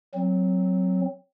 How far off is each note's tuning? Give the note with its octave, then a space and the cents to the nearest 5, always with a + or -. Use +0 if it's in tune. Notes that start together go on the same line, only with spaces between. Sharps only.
F#3 +0 C4 +0